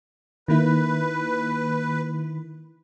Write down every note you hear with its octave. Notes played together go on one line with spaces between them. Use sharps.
D#3 A#3 E4 B4